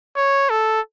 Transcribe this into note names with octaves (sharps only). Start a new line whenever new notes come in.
C#5
A4